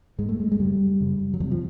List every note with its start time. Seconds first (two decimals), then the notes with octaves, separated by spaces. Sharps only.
0.18 G#2 G#3
0.29 A3
0.40 G#3
0.52 G#3
0.59 F#2 C#3 G3
1.00 F#2 C#3
1.34 F#3
1.40 F2 C3 F3
1.51 F3